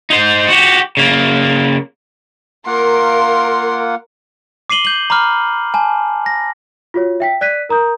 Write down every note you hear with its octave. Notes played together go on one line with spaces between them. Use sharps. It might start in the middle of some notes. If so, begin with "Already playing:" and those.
D#4 C5
F#4 G4
C#3 A#3
A#3 F4 A#4 F#5 C6
D6 C7 D#7 F#7 G7
G6 F#7
A#5 B5 D6 F6
G#5 A5
A#6
F4 F#4 C#5
E5 G5 B6
D5 F#6 B6 D#7
A#4 A#5 D#6 G6